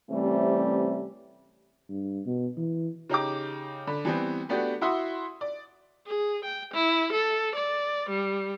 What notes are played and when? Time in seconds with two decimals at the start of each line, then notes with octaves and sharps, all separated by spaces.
0.11 C3 E3 G3 A3 C4 C#4
1.89 G2
2.26 B2
2.57 E3
3.09 C#3 D#4 G4 D6
3.87 D3 B5
4.05 E3 G3 B3 C4
4.49 A3 B3 D4 F#4 G4
4.81 E4 F#4 E5 F#5 C6 D#6
5.41 D5
6.07 G#4
6.45 G5
6.74 E4
7.13 A4
7.55 D5
8.09 G3